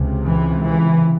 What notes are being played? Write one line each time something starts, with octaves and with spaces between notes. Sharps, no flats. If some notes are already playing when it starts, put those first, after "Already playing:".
Already playing: C#2 C3
E3
E3